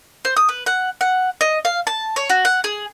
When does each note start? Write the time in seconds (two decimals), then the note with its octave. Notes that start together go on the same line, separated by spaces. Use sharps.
0.25 C5
0.37 D#6
0.49 B4
0.66 F#5
1.01 F#5
1.41 D#5
1.65 F5
1.87 A5
2.16 C#5
2.30 F#4
2.45 F#5
2.64 G#4